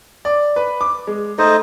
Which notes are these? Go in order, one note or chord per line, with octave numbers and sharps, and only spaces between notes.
D5
B4
D6
G#3
A3 D#4 C5 D#5